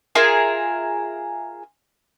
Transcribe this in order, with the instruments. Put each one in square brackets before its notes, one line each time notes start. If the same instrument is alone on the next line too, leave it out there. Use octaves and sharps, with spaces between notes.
[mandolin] F4 G#4 A#4 E5